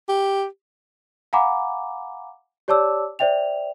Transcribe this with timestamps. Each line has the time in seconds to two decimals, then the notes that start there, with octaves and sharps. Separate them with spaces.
0.09 G4
1.33 F5 F#5 G#5 A#5 B5 D6
2.68 G4 C#5 D5 A5 D6 E6
3.19 C5 D5 E5 G5 F7